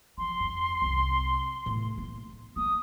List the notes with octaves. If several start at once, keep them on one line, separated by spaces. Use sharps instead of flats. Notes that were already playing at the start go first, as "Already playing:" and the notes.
F3 C6
F2
C2
A2
A#3
A#3 D#6